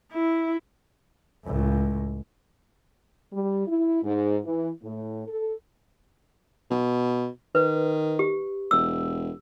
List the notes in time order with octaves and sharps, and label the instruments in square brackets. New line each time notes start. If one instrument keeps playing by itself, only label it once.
[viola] E4
[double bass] C#2 A2
[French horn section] G3
E4
G#2
E3
A2
A4
[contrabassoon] B2
[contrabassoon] D#3 [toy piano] B4
[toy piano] G4
[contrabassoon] E1 [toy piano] E6